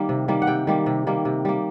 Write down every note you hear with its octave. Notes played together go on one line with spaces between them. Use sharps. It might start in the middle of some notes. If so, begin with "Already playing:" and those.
Already playing: D#3 G3 A#3
C3
D#3 G3 A#3
F#5
C3 G5
D#3 G3 A#3
C3
D#3 G3 A#3
C3
G3 A#3